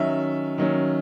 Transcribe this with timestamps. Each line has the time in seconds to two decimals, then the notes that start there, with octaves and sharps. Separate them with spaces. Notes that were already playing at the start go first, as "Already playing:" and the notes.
Already playing: D#3 F#3 C#4 E5
0.58 D#3 F#3 C#4